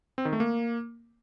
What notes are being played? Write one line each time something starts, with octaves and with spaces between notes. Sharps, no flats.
C4
D#3
A3
A#3